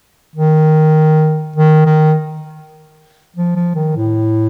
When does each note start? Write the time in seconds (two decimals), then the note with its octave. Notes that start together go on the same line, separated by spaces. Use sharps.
0.35 D#3
1.56 D#3
1.85 D#3
3.36 F3
3.56 F3
3.75 D#3
3.96 A2